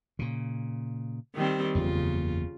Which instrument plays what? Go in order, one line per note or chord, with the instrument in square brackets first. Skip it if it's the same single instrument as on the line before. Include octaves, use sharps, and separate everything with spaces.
[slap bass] A#2 C#3
[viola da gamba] D#3 G3 C4
[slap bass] F#1 E2 A#3 [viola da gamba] C#3 F4